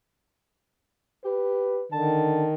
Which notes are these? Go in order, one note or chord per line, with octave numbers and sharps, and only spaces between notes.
G4 B4
D3 D#3 A5